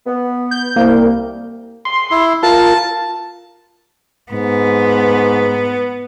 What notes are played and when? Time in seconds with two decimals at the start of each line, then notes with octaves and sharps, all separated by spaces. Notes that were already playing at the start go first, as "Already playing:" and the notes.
0.06 B3
0.51 G6
0.76 C2 A#3
1.85 C6
2.11 E4
2.43 F4 A#4 A5
4.32 G#2 B3